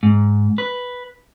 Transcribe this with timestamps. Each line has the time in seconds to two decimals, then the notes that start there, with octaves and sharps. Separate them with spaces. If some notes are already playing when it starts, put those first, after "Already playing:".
0.03 G#2
0.58 B4